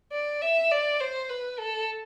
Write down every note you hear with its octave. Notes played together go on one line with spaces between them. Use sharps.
D5
E5
D5
C5
B4
A4